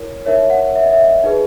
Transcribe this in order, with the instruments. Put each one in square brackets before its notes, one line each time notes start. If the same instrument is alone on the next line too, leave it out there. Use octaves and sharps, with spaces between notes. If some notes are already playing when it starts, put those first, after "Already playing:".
Already playing: [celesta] E4 A#4 C#5
D#4 A#4 C#5 E5
F#5
E5
D#5
E5
D#4 G#4 B4